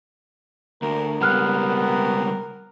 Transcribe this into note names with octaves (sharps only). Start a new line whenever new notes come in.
D2 A#4
C#2 G3 B3 A#5 F6 F#6